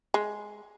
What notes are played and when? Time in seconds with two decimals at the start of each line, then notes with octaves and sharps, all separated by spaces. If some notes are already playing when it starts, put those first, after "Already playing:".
0.14 G#3